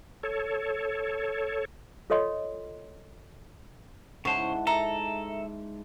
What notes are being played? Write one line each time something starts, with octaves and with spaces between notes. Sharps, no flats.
A4 C#5
F4 A4 C#5 D#5 C6
G#2 C#3 E4 C5 C#5 F#5 A5
A4 E5 A#5